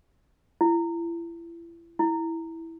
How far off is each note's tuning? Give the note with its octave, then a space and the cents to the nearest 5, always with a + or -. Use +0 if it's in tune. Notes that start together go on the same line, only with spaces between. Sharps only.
E4 +35
E4 -10